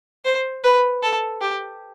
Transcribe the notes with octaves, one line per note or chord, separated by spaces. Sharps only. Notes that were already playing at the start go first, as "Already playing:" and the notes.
C5
B4
A4
G4